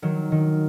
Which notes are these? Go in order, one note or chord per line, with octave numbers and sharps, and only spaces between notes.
D#3 F#3
D#3